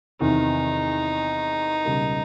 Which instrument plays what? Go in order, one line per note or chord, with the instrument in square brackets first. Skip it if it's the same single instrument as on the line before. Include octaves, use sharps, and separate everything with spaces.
[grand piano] E2 C3 D#3 [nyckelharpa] D#4
[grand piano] C#2 B2 G3 A#3